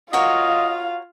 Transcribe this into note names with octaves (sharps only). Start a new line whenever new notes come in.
F4 F#4 A#4 C#5 D#5 F5